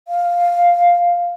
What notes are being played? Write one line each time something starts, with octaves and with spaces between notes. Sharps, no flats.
F5